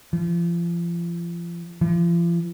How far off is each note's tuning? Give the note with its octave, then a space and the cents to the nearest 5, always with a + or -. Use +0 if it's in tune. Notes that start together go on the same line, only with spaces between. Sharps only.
F3 -35
F3 -40